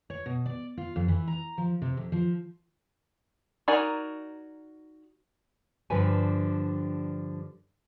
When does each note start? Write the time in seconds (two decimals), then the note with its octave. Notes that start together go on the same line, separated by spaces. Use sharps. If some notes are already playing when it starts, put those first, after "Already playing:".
0.10 C#5
0.26 B2
0.46 D5
0.77 F4
0.96 F2
1.08 E3
1.27 A#5
1.58 F3
1.82 C3
1.97 F2
2.12 F3
3.68 D#4 F#4 A#4 D5 G#5
5.90 G2 D3 F3 B4 G#5